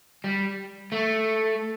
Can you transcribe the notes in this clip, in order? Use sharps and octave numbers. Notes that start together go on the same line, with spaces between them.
G3
A3